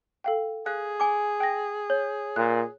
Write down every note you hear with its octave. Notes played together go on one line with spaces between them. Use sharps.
A4 F5 G5
G#4 F5 F#6
G#5 D6
G5 A#6
C#5
A#2 F#6